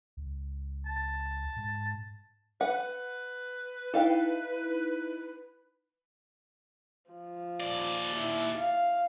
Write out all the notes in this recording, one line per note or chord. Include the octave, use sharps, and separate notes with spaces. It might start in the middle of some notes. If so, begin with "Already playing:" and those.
C#2
A5
G#2
B4 F#5
D#4 E4 A4 F5 G5
F3
D#2 D5
E4
F5